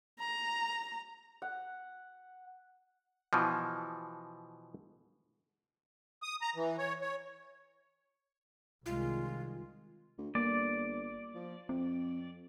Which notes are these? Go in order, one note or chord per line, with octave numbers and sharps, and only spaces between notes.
A#5
F#5
B2 E3 F3
D#6
A#5
E3
C#5
C#5
C2 D#3 G#3 F4
D2
G1 A#3 D5
F3
F2 C4